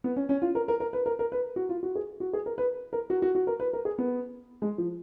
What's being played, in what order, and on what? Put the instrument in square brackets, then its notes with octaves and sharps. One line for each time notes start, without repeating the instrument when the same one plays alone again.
[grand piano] B3
C#4
C#4
F4
A#4
A#4
A#4
B4
A#4
A#4
B4
F#4
F4
F#4
G#4
F#4
G#4
A#4
B4
A#4
F#4
F#4
F#4
A#4
B4
A#4
G#4
B3
G#3
F3